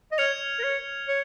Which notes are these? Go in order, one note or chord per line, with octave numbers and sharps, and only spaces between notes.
D#5
C#5 F6 G#6 C#7 F7
A#4
C#5
C#5